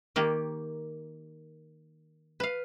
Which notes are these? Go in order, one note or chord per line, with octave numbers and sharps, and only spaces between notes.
D#3 A#3 G4
B4 F5